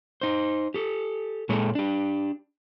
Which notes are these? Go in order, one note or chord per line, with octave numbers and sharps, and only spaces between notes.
D#4 C5
G4 A4
A#2 G#3 G#4 A4 C#5
D4 G4